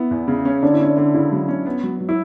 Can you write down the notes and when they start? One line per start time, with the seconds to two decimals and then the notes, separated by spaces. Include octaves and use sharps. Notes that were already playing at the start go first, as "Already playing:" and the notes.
Already playing: B3 E4
0.11 E2
0.28 C#3
0.45 C#4
0.63 D3 D4
0.74 E4
0.80 C#4
0.85 D4
0.97 D3
1.14 C#3 E4
1.32 F#3
1.48 C#4
1.66 B3
1.83 F#3
2.01 F#3
2.09 E4